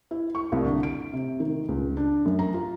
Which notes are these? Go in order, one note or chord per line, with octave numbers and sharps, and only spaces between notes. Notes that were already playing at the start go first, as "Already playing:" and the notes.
E4
C#6
C2
D3
D7
C3
D#3
C#2
D4
F#2
A#5
F4